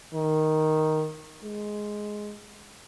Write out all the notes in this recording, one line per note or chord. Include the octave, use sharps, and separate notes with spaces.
D#3
G#3